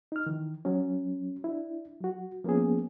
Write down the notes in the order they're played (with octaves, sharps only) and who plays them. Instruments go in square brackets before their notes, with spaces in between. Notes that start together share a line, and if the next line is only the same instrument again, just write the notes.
[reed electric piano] D#4 F6
D#3 E3
F#3 C#4
D4 E4
F#3 F#4
F3 A#3 B3 C#4 G#4